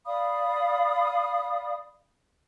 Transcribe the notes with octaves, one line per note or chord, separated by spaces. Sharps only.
D5 F5 B5 D#6